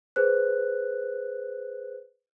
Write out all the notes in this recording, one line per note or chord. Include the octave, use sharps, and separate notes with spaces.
G#4 B4 C5 F#6